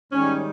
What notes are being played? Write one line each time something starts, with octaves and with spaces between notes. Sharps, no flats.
G#2 D#3 G3 C#4